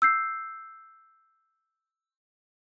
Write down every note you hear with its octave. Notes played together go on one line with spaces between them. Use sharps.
E6 G6 C7